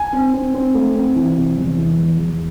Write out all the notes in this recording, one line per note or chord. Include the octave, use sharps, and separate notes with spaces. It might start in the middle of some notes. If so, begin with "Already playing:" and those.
Already playing: G#5
C4
C4
C4
A3
C4
E3
C3
E2
E3
E2
E2